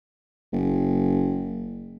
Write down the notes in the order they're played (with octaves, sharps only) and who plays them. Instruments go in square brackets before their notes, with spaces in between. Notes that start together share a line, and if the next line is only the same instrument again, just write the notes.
[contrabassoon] F#1